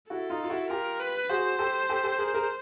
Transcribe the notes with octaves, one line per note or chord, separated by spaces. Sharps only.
E4 F#4 A4
D#4 F4
F4
E4 F#4
F4 G4 A#4
B4
F#4 G#4 C5
G4 A4
G4 A4
G4 A4
G#4 A#4
G#4 A#4